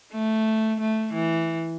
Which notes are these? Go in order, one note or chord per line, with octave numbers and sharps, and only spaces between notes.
A3
A3
E3